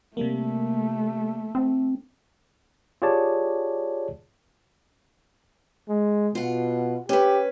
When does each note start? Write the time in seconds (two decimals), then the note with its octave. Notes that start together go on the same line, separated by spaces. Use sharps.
0.17 C3 G3 A3 A#3
1.55 C4
3.02 F4 G4 G#4 C#5 D5 A5
5.89 G#3
6.35 B2 F4 F#5
7.09 C#4 G4 B4